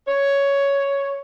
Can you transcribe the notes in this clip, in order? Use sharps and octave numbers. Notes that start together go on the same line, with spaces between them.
C#5